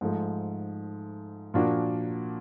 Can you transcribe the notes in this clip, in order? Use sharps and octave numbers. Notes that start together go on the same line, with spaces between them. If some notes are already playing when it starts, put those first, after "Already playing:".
G#2 F3 A3
A#2 F3 A#3 D4 F#4